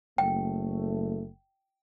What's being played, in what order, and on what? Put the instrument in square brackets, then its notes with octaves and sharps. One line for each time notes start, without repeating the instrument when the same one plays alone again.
[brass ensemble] F#1 A3 [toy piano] G5